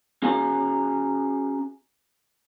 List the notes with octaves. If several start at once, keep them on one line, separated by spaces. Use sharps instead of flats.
C#4 F#4 G#4 F5 G#5 A#5